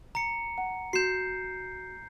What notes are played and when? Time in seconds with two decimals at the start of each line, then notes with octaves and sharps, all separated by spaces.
0.15 A#5 C#7
0.58 F#5
0.93 F#4 G6 C7 E7